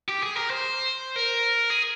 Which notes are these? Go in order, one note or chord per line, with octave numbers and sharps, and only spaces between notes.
G4
G#4
A#4
C5
A#4
G#4